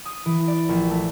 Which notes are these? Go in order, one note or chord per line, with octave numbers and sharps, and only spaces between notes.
D#6
E3
D5
A#1
A3